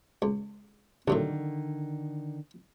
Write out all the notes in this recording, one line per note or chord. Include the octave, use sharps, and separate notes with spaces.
C#2
C2 F#2 A2 D3 D#3